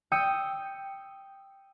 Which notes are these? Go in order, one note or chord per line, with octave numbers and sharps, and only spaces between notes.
G5 D#6 E6 G6 C#7 D#7